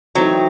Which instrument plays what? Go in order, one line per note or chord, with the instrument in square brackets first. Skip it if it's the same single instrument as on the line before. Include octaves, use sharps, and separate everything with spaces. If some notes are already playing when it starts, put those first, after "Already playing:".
[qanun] E3 A3 C4 D#4 [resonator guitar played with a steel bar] F#3